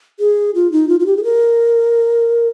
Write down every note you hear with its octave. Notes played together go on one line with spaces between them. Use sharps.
G#4
F4
D#4
F4
F4
G4
G#4
A#4